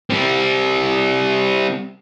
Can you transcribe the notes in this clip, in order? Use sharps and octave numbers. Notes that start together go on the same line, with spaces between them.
G3 C4